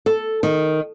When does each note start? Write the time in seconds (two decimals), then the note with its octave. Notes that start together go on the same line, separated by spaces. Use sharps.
0.06 A4
0.43 D#3